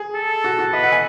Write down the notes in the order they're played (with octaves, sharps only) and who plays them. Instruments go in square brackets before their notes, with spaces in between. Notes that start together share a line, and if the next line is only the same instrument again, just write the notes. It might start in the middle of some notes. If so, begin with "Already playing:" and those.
Already playing: [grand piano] G#4
[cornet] A4
[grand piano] F#4
F#4
[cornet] B4 [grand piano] D#5
[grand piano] F#5
G#5